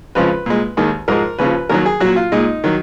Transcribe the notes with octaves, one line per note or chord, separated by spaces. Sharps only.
F2 C#3 F3 G#3 B4
A#2 G#3
D#2 D#3 G#3
G#2 F3 G#3 A#4
D#2 C#3 F3 B4
D#2 D#3 F#3 A#4
G#4
A#2 F#3 F#4
F4
A#2 G#3 D#4
D#3 F#3